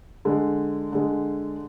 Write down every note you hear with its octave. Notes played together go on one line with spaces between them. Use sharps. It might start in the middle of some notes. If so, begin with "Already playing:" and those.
D3 G#3
D3 G#3